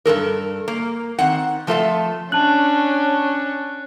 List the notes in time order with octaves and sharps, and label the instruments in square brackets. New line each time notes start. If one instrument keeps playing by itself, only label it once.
[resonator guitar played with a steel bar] G2 G#3 A4 A#4
A#3
D#3 C4 F#5
F3 A3 F4 A4 E5 A5
[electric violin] C#4 D4 [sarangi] C#5 [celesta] A5 F#7 [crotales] F#6